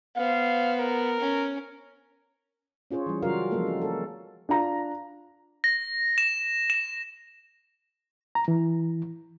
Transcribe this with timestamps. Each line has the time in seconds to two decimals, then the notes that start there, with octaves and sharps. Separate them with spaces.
0.16 B3 C5 F5
0.79 A#4
1.20 C#4
2.91 C#4 F4 G#4 C5 C#5
3.06 E3 G3
3.23 C#3 F#3 F4 F#4 A#4 F5
3.51 F3 F#3 G#3 A#3 A4
3.66 C4
3.82 A4 A#4
4.49 D4 F4 A#5
5.64 A#6
6.18 E7
6.70 E7
8.35 A#5
8.48 E3